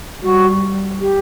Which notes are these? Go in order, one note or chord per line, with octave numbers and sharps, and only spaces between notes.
G3 F#4
G4